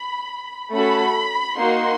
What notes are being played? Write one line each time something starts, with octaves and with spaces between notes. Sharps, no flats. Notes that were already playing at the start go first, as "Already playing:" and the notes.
Already playing: B5
A3 C#4 F#4 A4 B5
A#3 D#4 F#4 C6